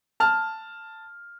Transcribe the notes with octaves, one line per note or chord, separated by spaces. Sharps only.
A5 F6